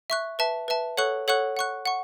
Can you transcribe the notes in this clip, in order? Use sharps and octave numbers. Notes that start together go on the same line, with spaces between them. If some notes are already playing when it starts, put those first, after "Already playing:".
E5 C#6 F#6
B4 E5 A5
B4 E5 A5
A4 C#5 F#5 C#6 F#6
A4 C#5 F#5 C#6 F#6
F#5 C#6 F#6
F#5 C#6